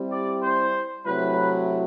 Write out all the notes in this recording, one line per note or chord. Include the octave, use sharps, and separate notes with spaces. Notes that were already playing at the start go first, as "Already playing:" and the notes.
Already playing: G3 C4 E4 G4
D5
C5
C3 F#3 A3 E4 B4